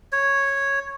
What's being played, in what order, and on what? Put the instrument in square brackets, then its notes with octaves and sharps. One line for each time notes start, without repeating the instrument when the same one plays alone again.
[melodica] C#5